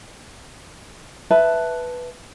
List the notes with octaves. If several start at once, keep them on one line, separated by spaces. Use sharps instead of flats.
B4 E5 A5